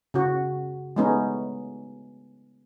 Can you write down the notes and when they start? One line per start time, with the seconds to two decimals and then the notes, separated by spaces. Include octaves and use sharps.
0.14 C#3 F#4
0.96 G#3 A3 B3 C#4 D#4